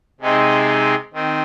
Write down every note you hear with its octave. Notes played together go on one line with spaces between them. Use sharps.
C3 G#3 C4 D#4
D#3 C4